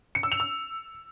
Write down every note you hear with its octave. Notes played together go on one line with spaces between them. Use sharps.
C#7
E6
F7
E6